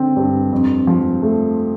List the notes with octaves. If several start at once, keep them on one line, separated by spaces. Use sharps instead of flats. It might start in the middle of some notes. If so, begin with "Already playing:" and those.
Already playing: D3 C4
G2
F2
F3
A3